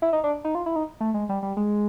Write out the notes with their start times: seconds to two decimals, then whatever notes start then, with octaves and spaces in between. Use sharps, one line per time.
0.02 E4
0.13 D#4
0.24 D4
0.45 D#4
0.55 F4
0.66 E4
0.76 D#4
1.00 A3
1.14 G#3
1.29 G3
1.43 G3
1.57 G#3